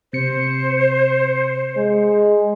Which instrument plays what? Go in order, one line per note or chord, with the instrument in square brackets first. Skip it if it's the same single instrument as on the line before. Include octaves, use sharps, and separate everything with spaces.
[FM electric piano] C3 C#7 [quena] C5
[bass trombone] G#3